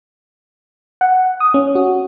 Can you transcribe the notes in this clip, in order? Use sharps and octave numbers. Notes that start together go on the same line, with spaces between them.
F#5
D#6
C#4
F#4